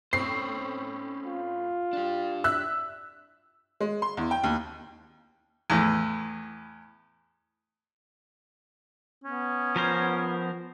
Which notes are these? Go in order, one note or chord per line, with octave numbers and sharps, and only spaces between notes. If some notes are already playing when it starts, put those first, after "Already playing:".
A2 C4 C#4 C5 C7
F4
D4 G4
E5 E6 F#6
G#3
C6
E2
G5
D#2
E2 A2
B3 C#4
F3 A#4 C5